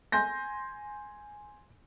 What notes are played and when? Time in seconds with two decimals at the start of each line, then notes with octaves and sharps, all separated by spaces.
0.12 G#5 C6 G6 A#6